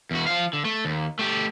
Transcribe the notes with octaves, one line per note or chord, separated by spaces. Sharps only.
E2 F#4
F3 F5
D3
A3
D#2
A3 G4